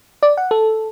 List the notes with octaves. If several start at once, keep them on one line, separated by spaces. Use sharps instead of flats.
D5
F#5
A4